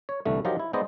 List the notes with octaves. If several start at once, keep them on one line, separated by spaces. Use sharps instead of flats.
C#5
C2 D3 E3 A3
F3 F#3 D#4 F4 G4 A#4
E4
G#3 B3 D#4 C5 D5 D#5